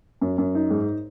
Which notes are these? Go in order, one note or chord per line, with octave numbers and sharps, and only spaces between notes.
F#2
F#2
D#4
G#2